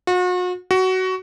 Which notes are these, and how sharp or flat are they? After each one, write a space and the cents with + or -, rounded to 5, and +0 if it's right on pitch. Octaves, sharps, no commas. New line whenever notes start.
F#4 -40
F#4 +15